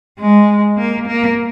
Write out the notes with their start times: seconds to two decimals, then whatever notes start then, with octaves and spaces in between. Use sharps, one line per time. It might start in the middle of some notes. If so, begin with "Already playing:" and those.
0.19 G#3
0.78 A#3
1.07 A#3